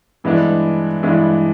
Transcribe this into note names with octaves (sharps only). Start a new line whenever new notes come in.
G2 E3 G#3 B3 D4
G2 E3 G#3 B3 D4